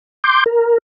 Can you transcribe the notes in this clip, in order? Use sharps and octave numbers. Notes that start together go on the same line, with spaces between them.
C6 D6 G6
A#4